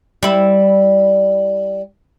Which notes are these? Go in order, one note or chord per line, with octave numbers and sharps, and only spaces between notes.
G3 E4